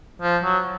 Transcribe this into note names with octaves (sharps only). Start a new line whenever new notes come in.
F3
F#3